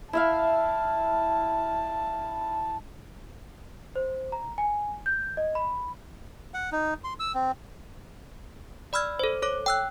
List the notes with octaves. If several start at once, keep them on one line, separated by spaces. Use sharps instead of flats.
E4 E5 F5 A5
C5
A#5
G#5
G6
D#5
B5
F#5
D#4
C6
E6
C4
D5 B5 E6 F6 G#6
A4 C5
A4 C#5 D6
G5 E6 F#6